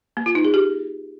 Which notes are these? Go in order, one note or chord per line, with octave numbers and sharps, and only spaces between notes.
A#3
F4
D#4
G#4
G4